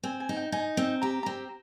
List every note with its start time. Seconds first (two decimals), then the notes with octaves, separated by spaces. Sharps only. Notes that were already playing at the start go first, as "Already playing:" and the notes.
0.03 C4 G#5
0.20 G#5
0.29 D#4
0.36 G5
0.52 D#4 G#5
0.77 C4
1.02 G4 A#5
1.23 C4 A#5